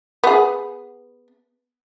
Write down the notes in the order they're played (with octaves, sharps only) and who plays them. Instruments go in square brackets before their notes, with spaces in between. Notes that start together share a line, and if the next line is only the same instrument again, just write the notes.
[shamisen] B3 G#4